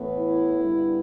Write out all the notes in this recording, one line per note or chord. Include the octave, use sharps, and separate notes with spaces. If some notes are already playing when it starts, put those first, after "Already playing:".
Already playing: A2 E3 B3
E4
G2 D3 B3